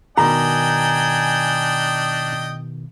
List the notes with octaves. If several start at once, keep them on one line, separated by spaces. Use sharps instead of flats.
B2 D#3 D4 D#5 G5 G#5 A#5